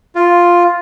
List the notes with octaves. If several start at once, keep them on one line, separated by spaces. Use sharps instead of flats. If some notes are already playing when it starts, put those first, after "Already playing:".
F4